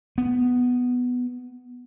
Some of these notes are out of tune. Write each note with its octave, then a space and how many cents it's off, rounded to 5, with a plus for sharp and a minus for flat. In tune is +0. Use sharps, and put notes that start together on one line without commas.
B3 +5